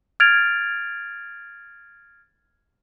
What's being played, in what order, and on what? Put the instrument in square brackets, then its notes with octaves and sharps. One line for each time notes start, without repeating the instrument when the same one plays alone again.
[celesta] F6 G#6 A6 D7 F7